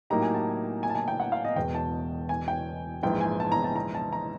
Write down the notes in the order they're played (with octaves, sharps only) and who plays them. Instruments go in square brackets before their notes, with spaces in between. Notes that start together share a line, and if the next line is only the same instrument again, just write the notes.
[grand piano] A2 F#3 A#3 D#4 G4 [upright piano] A#5
[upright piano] G#5
A5
G#5
A5
G#5
G5
F#5
F5
D#5
[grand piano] E1 E2 B2 [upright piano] G5
[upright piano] A5
G#5
G5
[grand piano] A#1 G#2 E3 [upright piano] G5
[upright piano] G#5
A5
A#5
A5
A#5
A5
A#5